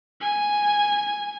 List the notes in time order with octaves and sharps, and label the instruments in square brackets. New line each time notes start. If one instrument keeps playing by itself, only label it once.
[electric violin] G#5